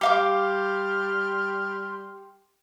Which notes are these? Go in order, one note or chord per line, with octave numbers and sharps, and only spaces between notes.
G3 G4 F5 C6 D6 F6